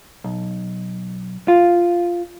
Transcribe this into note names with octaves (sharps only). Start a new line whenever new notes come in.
B1
F4